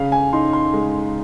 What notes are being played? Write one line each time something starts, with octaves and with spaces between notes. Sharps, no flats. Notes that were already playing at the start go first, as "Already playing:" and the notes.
Already playing: C#3 F5
G#5
D#4 C6
C6
G#3